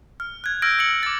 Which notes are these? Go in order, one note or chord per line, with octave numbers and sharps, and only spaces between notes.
F6
F#6 G#6
E6 F6 G6 G#6 A#6 D7
E6 C#7 F#7
D6 A6